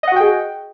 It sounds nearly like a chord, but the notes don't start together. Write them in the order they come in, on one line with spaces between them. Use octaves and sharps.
D#5 F#5 F#4 G5 G#4